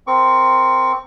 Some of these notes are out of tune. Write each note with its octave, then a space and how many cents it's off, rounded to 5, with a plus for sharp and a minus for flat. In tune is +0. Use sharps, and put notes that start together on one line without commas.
C4 -5 A#4 +0 C#6 +25